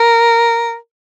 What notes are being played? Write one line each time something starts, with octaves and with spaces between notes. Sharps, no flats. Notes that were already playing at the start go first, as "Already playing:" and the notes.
Already playing: A#4